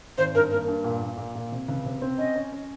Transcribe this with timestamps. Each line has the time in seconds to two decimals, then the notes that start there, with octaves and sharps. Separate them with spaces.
0.18 G#1 C5
0.35 G2 A#4
0.51 A#3 A#4
0.68 G2
0.84 A#2
1.01 A#2
1.18 A#2
1.35 A#2
1.52 C3
1.68 C#2
1.85 C3
2.02 C4
2.18 C#4 D#5
2.35 C#4
2.52 C#4